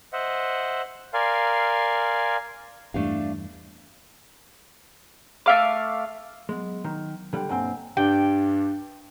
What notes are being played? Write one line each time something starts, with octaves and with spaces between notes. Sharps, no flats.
C5 D#5 E5 F#5
A#4 D5 F5 G#5 C6
E2 G2 A3 D4 F5
A3 E5 F5 D6
F#3 G#3 B3
D#3
D3 G3 A4 G5
B1 G2 A#3 C4 F#5 G#5
G2 D4 G4 G5